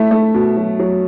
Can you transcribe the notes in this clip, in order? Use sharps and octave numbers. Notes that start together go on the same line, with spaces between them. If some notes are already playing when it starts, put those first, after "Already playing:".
Already playing: A3 E4
A3
B2
F#3
F#3